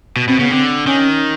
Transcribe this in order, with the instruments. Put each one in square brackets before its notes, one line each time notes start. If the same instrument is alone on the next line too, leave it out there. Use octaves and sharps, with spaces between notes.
[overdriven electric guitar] B2
[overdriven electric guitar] B2 [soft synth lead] C4
[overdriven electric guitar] C#3 [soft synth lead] B3
[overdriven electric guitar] D3 [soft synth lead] C4
[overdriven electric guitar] D#3 [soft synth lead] C#4